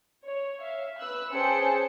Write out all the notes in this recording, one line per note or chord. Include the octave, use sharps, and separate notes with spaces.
C#5
E5 F5
B4 E6 F#6
C#4 G#4 C5 G5 A5 C#7